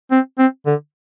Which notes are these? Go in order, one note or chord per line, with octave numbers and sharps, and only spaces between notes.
C4
C4
D3